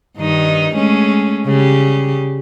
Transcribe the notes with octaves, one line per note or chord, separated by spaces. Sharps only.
G2 D#3 D#4
G#3 A3 C#4
C#3 G3 G4